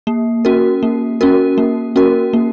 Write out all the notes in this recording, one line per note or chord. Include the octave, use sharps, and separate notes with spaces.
A#3
C#4 F#4 A#4
A#3
C#4 F#4 A#4
A#3
C#4 F#4 A#4
A#3